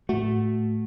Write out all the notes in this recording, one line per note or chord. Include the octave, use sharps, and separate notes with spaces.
A2 A3 F#4